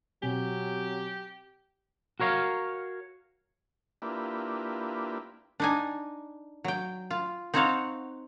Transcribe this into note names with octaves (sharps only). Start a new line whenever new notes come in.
B2 F#3 C4 G4 G#5
F#4 A#4 C#5 F5
A#3 D4 E4 F4 G4 B4
D4 D#4 G#5
F#3 G5
F4
C4 D#4 C5 C#5 F5 F#5